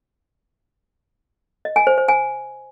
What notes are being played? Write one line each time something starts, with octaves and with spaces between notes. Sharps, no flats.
D#5
G#5
C5
C5
G#5